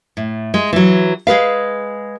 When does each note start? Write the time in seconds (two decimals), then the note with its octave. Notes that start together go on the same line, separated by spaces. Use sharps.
0.17 A2
0.54 G#3
0.73 E3 F#3
1.27 G#3 G#4 B4 F5